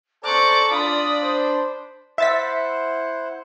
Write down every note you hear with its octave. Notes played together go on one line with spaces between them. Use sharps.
A4 C5 D5 A#5 C#6 D6 F#6
D4 F4 D5 B5 D#6
C5
E4 C5 E5 F#5 A6 B6